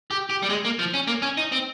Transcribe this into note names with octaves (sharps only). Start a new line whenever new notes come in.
G4
G4
G3
G#3
A#3
F3
C#4
A#3
C#4
D#4
C4